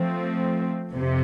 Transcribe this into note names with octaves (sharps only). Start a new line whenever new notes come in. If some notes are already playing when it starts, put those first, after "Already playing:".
Already playing: F3 A3 C4
F2 C3